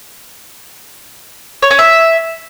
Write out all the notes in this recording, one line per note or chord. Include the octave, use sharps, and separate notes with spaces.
C#5
C#4
E5